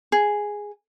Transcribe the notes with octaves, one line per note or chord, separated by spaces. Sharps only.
G#4